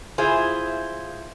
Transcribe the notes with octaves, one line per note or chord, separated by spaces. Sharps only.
E4 F4 G#4 C5 F5